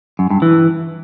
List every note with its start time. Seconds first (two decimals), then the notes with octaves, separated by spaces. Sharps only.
0.19 F#2
0.30 G2
0.42 E3